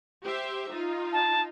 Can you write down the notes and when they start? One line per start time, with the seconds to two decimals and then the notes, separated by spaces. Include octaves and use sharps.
0.23 G4 C5 E5
0.71 D#4 F4
1.13 A5